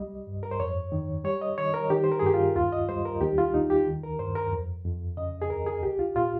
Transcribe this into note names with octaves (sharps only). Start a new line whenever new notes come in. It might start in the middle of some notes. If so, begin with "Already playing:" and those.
Already playing: C2 G3 D#5
G2
A#4
C5
F2 C#5
D#3
G3 C#5
D#5
D#3 C#5
A#4
D#3 G4
C5
A#4
G#4
G2 G4
F4
D#2 F4
D#5
G3 C5
A#4
D#2 G4
F4
D#2 D#4
G4
D#3
A#4
G2 C5
A#4
F2
F2
C#3 D#5
G#4
D#2 A#4
G#4
C2 G4
F4
A#2 F4